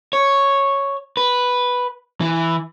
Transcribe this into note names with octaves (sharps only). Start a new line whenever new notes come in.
C#5
B4
E3